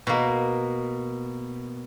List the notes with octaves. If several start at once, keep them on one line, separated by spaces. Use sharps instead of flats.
B2 A#3